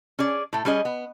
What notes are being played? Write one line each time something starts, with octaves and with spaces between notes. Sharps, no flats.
C#4 G#4 D5
A2 A3
G3 C#4 G#4 D#5
B3